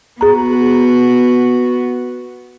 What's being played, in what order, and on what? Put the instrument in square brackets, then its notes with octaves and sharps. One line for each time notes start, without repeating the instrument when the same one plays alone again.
[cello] B3 F#4 [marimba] G#4 A#5